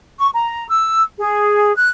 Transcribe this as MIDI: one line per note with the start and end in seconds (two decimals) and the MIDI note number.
0.19 0.28 85
0.34 0.67 82
0.69 1.01 88
1.19 1.75 68
1.76 1.91 90